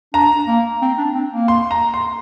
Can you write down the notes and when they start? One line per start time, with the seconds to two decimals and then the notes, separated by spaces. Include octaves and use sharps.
0.14 D4 A#5
0.47 A#3
0.82 C4
0.98 D4
1.15 C4
1.31 A#3
1.48 C6
1.71 A#5
1.94 C6